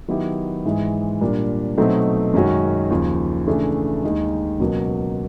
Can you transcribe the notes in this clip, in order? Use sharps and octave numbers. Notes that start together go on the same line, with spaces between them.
D#3 F#3 B3 E4 G4
G#2 E3 G#3
A#2 G3 A#3 D4
B2 F#3 A3 C4 D#4
F#2 D#3 G#3 C#4 F#4
D#2 C#3 F3
C#3 E3 A3 D4
D#2 D#3 G#3
C#2 B2 F#3 A#3